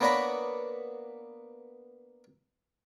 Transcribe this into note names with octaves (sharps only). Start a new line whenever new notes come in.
A#3 B3 D4 C#5 A#5 B5